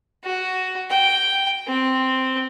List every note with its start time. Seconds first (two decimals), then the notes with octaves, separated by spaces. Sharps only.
0.24 F#4
0.90 G5
1.67 C4